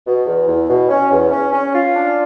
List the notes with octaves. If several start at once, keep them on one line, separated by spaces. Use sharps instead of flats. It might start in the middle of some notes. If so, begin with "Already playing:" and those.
B2
E2
E2
B2
C#4
E2
C#4
C#4
F4
D4